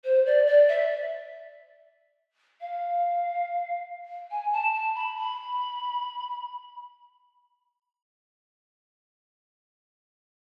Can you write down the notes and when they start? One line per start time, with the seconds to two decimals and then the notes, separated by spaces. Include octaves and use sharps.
0.04 C5
0.26 D5
0.46 D5
0.68 E5
2.60 F5
4.30 G#5
4.52 A5
4.73 A5
4.95 B5
5.16 B5